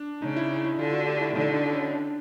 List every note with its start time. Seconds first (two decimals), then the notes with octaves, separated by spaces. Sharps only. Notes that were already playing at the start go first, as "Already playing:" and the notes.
Already playing: D4
0.22 C#3 D#4
0.36 E4
0.65 E4
0.78 D3 F4
0.93 F#4
1.06 G4
1.21 E4
1.35 D3 D#4
1.54 D4
1.73 C#4
1.92 D4